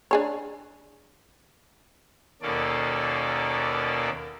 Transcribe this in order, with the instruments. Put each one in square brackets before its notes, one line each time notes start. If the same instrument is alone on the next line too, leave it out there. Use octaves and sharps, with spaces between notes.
[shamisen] D4 G#4 C#5
[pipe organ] D#2 B2 A#3 C#4 A4 D5